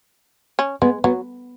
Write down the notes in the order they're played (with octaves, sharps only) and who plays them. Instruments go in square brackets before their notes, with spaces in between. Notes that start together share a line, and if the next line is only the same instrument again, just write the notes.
[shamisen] C#4
[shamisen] G#3 [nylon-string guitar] B3
[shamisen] F#3 [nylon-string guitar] B3